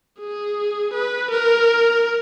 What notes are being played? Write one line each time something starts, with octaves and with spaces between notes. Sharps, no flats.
G#4
B4
A#4